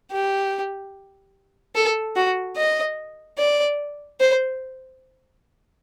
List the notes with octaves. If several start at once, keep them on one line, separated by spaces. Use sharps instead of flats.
G4
A4
F#4
D#5
D5
C5